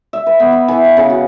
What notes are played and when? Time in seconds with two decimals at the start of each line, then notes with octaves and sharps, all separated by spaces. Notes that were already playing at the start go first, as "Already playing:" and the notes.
0.13 E5
0.26 B4
0.40 B3
0.52 B5
0.68 E3
0.85 F5
0.97 C#3
1.10 F#4